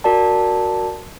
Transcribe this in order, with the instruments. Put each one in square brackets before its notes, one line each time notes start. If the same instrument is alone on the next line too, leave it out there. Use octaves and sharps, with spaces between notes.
[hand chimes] F#4 A#4 D5 A5